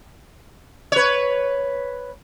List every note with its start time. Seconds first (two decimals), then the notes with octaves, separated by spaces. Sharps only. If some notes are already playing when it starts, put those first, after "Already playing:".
0.92 B4 C#5